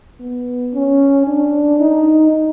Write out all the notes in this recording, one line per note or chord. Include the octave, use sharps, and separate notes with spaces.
B3
C#4
D4
D#4